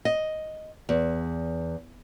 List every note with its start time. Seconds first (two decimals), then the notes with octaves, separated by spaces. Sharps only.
0.05 D#5
0.89 E2